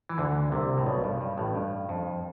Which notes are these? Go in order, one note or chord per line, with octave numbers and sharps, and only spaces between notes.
E3
D2 D3
C2 C3
A2
B1 B2
G2
G2
A1 A2
G2
F2